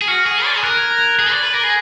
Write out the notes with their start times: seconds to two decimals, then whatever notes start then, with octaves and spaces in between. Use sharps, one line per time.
0.02 G#4
0.08 F#4 F6
0.26 G#4
0.45 D5
0.56 G#4
0.63 A#4 F#6
0.77 G#6
0.91 F#6
0.98 G#6
1.05 F#6
1.19 G#4
1.32 D5
1.42 B4
1.53 A#4
1.64 G#4